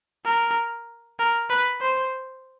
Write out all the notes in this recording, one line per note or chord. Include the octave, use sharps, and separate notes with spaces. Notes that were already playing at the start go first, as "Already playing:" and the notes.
A#4
A#4
B4
C5